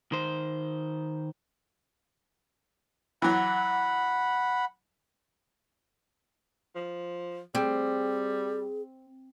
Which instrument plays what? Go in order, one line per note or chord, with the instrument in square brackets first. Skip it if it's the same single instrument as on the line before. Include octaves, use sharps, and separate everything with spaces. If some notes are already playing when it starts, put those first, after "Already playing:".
[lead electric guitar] D#3 C5
[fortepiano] E3 F#3 [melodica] F#5 B5
[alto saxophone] F3
[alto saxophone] G3 [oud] C4 [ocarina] G#4